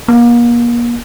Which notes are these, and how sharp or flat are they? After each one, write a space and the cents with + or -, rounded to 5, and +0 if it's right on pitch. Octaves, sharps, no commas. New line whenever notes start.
A#3 +35